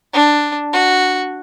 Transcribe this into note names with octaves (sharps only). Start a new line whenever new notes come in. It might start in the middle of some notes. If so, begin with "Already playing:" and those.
D4
F#4